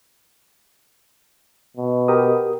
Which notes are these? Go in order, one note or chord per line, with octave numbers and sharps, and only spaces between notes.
B2
G4 A#4 D#6